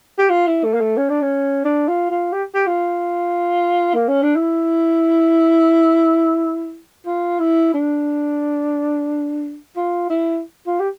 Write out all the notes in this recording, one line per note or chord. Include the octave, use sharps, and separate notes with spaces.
G4
F4
E4
A3
A#3
A3
C#4
D4
C#4
D4
F4
F4
G4
G4
F4
A#3
C#4
D4
E4
F4
E4
D4
F4
E4
F4
G4